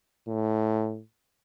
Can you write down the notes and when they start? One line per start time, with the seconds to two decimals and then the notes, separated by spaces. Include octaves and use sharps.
0.27 A2